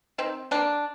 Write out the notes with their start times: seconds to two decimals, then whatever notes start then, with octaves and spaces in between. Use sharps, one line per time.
0.18 D#3 C4
0.51 G3 A#3 D4